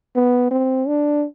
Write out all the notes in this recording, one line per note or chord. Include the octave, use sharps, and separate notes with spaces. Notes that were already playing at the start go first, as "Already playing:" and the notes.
B3
C4
D4